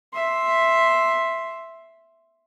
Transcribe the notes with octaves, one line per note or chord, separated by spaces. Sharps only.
E5 C6